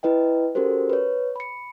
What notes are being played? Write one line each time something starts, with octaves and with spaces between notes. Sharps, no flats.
E4 B4 D#5 G5
C#4 F#4 G4 A4 A#4 C5
B4 C#5
B5 C#7